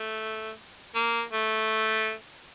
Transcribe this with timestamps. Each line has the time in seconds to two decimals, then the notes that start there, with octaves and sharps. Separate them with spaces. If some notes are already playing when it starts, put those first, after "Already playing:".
Already playing: A3
0.95 A#3
1.33 A3